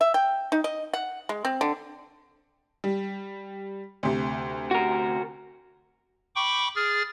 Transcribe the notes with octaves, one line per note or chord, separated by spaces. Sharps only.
E5
G5
D#4
D#5
F#5
G#3
C4
D3
G3
D2 C3
F#4 A#4
G5 B5 C#6 D6
G#4 F6 A6